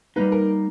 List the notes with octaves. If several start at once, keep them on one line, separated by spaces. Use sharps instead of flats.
G3 A#3 D#4 B4
A#4